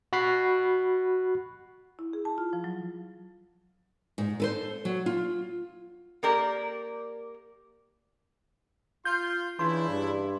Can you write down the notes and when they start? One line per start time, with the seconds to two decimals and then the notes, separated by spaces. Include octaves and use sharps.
0.13 F#4 B5 F#6 C7
1.99 E4
2.13 G#4
2.25 A5
2.38 F4
2.53 F3
2.64 F#3
4.18 G#2
4.40 A4 B4 C5
4.85 F#3
5.06 F4
6.23 A#3 G4 A#4 D5
9.05 F4 C6 G6
9.59 C#3 E3 D4 E4 C6
9.90 G2